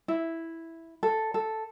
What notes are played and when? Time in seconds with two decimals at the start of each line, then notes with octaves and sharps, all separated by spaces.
0.08 E4
1.03 A4
1.34 A4